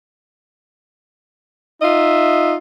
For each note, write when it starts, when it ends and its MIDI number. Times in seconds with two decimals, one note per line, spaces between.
1.82 2.56 63
1.82 2.56 65
1.82 2.56 75
1.82 2.56 76